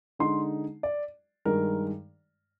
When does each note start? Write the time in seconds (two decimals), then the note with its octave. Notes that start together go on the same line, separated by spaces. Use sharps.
0.19 D3 G#3 D#4 C6
0.83 D5
1.45 G2 D#3 G#3 A#4